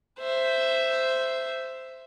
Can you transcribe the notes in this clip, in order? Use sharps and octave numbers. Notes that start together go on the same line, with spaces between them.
C5 E5